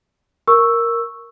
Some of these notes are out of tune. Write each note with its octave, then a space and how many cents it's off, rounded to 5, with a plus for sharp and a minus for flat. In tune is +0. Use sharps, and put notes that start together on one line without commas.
A#4 +0 C#6 +0 E6 +0